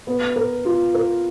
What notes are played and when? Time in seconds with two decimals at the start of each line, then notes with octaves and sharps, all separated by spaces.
0.07 B3
0.36 A#4
0.65 F4
0.94 A#4